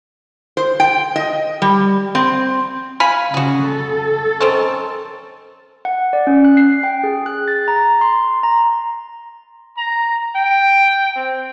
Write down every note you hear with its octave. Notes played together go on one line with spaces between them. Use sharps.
C5
G5
D#5
G3
C4
F5 G#5 B5
C#3 F#4 G#4
A4
D#3 C4 C#4
F#5
D5
C#4
F#6
C7
G5
G#4
F#6
A6
A#5
C6
A#5
A#5
G5
C4